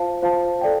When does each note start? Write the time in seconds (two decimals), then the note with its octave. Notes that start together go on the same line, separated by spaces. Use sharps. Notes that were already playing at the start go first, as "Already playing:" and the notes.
Already playing: F4 C5 F5 A5
0.22 F4 C5 F5 A5
0.61 A4 D5 G5